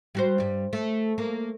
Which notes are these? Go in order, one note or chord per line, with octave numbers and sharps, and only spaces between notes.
G3 F#4 C5
G2 G3
A3
A#3